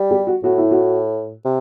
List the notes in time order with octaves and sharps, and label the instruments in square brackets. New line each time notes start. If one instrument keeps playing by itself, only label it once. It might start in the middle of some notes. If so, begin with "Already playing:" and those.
Already playing: [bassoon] G3
[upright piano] G4
F#4
[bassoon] A2 [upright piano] F#4
[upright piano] E4
F#4
[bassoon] C3